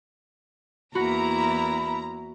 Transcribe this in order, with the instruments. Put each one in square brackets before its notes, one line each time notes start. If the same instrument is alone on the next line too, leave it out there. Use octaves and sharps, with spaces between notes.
[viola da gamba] E2 A#3 E4 [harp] F#4 [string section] A#5 [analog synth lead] B5